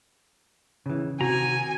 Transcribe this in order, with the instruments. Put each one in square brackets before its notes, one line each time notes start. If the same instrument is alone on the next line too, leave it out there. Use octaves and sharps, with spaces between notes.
[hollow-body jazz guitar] C#3 E3
[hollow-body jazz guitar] C3 [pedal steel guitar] D#3 A#5 [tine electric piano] F#4 [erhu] G#5